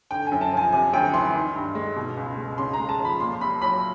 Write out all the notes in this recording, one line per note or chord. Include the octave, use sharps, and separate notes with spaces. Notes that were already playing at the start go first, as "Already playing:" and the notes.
D3 G5
F#2 G#5
A5
F3 G#5
C3 G#5
D2 G5
E3 C6
D#3
G2
G#3
B2
C#2
G#3
C#3 C6
A#5
G#3
A5
F3
B5
A#2 C6
C6
C2 B5
F#3 B5